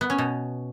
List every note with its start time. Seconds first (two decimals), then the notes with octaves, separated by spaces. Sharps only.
0.01 B3
0.10 C#4
0.18 B2